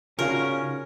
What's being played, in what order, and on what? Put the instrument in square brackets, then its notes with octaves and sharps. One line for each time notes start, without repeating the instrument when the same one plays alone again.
[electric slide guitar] C#3 D#4 [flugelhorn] C#4 [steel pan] F4 F#4 F5 [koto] A#4